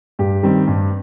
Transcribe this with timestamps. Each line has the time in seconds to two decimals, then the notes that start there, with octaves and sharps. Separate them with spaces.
0.19 G2 G4
0.43 D#3 G3 C4
0.68 G2